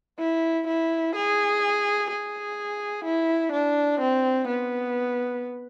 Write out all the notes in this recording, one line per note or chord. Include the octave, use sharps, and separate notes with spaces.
E4
E4
G#4
G#4
E4
D4
C4
B3